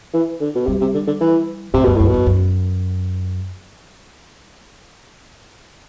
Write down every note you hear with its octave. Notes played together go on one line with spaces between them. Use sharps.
E3
D3
B2
C3 G3
C3
D3
D3
E3
A2 C3
F#2 B2
F#2 A2
B2
F#2
F#2